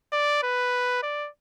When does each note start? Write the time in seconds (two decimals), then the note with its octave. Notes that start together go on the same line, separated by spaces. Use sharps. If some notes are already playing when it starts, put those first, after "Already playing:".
0.13 D5
0.43 B4
1.03 D5